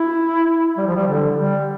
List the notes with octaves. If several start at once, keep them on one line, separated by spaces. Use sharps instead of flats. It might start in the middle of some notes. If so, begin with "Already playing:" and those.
Already playing: E4
G3
F3
G3
D3
G3